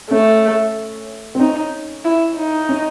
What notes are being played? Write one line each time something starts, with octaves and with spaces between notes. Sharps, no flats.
A3 C#4
C4
C#4 D#4
E4
D#4
C#4